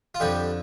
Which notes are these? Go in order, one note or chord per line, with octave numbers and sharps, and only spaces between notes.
F4
F2 D3 G3 G4